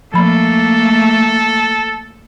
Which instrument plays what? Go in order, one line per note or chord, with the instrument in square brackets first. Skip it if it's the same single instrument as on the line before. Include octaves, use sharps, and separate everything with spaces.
[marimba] F3 B5 [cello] A3 A#3 [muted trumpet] A4